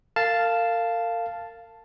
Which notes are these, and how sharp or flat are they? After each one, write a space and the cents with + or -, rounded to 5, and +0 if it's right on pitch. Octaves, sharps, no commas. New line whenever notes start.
A#4 -40 F5 -10 A5 +0